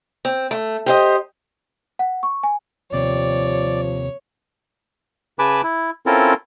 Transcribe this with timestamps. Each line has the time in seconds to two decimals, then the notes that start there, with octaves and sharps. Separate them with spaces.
0.25 C4
0.51 A3
0.86 G4 C5 D#5
1.99 F#5
2.23 C#6
2.43 G#5
2.93 D#2 C3 F3 C#5 D5
5.39 C#3 B4 G#5 A5 B5 D6
5.63 E4
6.06 C4 C#4 E4 F4 A4 A#4